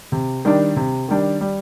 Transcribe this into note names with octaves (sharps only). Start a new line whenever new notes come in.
C3
D#3 G3 D4
C3
D#3 G3 D4
G3